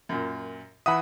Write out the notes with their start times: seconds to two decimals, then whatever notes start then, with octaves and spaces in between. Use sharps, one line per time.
0.09 F#2 A#2
0.86 E3 E5 F#5 B5 D#6